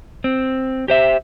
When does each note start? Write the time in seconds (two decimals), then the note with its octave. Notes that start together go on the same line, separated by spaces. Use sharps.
0.24 C4
0.88 G4 C5 E5